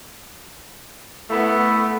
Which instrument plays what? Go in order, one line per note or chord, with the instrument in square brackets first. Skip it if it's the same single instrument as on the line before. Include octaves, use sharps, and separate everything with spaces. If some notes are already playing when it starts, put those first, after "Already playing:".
[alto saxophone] A3 [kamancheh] B3 E4